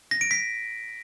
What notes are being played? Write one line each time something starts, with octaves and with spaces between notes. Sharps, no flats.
A#6
D7
B6